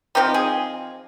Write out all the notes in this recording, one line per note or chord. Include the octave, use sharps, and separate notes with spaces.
F3 C4 D#4 G4
G#4